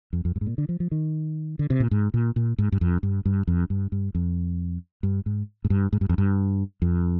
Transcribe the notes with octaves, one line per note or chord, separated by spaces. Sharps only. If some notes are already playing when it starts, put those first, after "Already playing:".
F2
F2
G2
G#2
A#2
D3
F3
F3
D#3
D3
C3
A#2
G#2
A#2
A#2
G#2
G2
F2
G2
G2
F2
G2
G2
F2
G2
G#2
G#2
G2
G#2
G2
F2
G2
F2